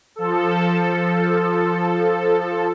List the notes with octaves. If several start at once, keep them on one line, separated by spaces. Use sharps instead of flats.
F3 A4